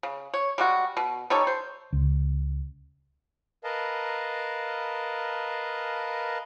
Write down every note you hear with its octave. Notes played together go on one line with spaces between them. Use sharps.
C#3
C#5
G3 G#3 F#4
B2
G3 D#4 A4 C#5
C5
C#2
A#4 B4 D#5 F5 A5